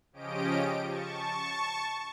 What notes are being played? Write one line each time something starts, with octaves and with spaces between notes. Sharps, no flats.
C#3 F3 C#4 G4 D#5 D7
A5 C#6